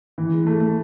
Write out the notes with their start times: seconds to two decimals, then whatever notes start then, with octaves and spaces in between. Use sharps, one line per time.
0.18 E3
0.32 G#3
0.47 A3
0.60 A3